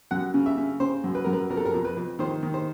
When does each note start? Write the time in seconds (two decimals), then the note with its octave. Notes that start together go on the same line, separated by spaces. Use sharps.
0.11 F#2 F#5
0.34 C#3
0.46 E5
0.58 C#3
0.80 C#3 C5
1.04 F#2
1.15 B4
1.25 F#2 A#4
1.33 B4
1.50 F2 A#4
1.57 A4
1.65 A#4
1.74 F2
1.85 B4
1.97 F2
2.19 D#3 C5
2.43 D#3
2.54 C5